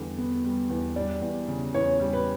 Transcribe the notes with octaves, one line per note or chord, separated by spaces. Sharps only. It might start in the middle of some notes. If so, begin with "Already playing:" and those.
Already playing: E2 D3 G3
B3
G3
E2
G3 D5
E2
C#3
E2 C#5
G3
B4